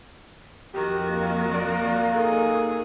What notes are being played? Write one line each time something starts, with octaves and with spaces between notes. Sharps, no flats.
F2 D#3 F3 F#4 G4
A#3
A#3 D5
D#4 G#4 A4